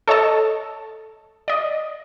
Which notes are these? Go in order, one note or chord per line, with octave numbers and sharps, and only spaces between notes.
A4 C#5 D#5 A5
D5 D#5